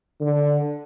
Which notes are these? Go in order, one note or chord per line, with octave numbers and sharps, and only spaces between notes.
D3